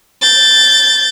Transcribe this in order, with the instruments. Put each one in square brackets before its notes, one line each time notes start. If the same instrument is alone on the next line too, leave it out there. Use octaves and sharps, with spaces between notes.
[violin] G6 A6